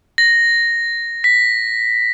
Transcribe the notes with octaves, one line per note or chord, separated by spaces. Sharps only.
A#6
B6